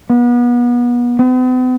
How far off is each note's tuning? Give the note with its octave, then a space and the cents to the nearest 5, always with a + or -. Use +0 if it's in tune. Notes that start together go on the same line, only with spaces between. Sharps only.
B3 -30
B3 +45